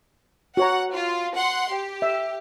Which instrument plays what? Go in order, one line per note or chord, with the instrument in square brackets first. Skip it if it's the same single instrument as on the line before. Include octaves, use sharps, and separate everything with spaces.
[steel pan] F#4 C#5 A#5 [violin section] F#5
[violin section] F4
F#5 C6
G4
[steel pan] E5